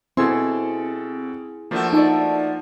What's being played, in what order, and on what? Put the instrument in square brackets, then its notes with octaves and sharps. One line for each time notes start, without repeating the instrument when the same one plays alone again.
[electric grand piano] B2 A4 C6 [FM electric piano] C4 [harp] E4 G#4
[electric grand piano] F3 A#3 [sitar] A3 D4 F#4
[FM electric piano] D#4 A5 [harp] A4 D5